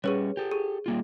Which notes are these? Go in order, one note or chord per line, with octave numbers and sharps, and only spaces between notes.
G3 C#4 G#4 B4 C#5
G4 A4
G#4
G3 A#3 F4